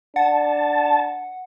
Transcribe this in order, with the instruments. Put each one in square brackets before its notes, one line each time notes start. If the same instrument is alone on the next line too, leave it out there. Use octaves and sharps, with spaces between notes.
[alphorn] D4 [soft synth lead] F#5 [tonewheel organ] A5